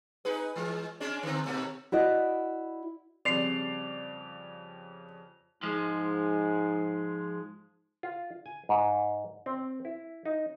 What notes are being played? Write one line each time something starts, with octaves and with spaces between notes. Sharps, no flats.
D#4 G#4 B4
E3 G#3
G#3 C#4 D4
D3 C4
D#2 B2 A3
E4 F#4 D5 D#5
F2 C#3 G3 C4 D5 C7 F7
G#2 F3 G#3
F4
G#5
G#2
C4
E4
D#4